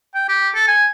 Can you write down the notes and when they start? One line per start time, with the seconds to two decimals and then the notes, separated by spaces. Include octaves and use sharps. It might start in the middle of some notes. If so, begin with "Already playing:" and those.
0.14 G5
0.29 G4
0.55 A4
0.67 G#5